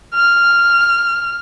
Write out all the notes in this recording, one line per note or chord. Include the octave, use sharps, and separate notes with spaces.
F6